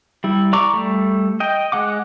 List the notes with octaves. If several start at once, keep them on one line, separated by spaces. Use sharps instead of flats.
G3 E4
D5 A#5 C#6 D6
G3 A3
D#5 G5
G#3 F#5 D6